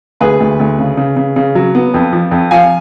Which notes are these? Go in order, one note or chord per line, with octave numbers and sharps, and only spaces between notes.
D2 G#4 B4
D2
D2
C#3
C#3
C#3
C#3
F#3
B3
F2
F3
F2
F3 F5 G#5